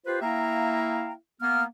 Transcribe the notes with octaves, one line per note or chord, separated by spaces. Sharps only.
F4 G4 B4 C5
A#3 E4 E5 F5 G5 A#5
A#3 B3 F6